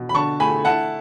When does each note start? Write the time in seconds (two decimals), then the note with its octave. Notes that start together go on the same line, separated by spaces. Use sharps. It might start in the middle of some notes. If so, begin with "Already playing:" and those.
Already playing: B2
0.09 B5
0.15 D3 A5 C#6
0.40 A3 G#5 B5
0.65 E4 F#5 A5